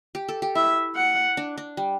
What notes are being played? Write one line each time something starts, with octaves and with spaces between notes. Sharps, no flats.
G4
A4
G4
E4 E5
F#5
D4
D4
G3